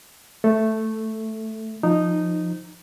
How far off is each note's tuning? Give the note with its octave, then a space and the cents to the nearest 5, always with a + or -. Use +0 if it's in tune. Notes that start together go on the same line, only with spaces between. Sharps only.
A3 +0 A4 +0
F3 +0 D#4 -10